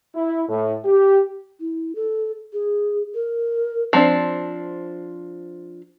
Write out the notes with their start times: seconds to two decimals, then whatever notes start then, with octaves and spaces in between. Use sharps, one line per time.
0.15 E4
0.49 A2
0.85 G4
1.60 E4
1.96 A4
2.53 G#4
3.15 A#4
3.93 F3 C4 D4